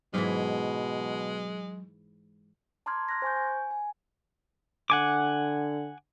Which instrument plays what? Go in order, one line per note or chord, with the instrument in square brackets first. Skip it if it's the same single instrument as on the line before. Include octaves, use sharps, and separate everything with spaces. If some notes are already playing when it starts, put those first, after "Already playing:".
[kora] G#2 E3 [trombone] B2 [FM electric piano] F#3 [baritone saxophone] G#3
[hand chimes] A5 A#5 C6 D6 F6 G#6
C6 F6 F#6 G#6 A#6
C5 G#5 C#6 G6
G#5
G#5
[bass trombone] D3 [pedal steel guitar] F#5 G#5 D6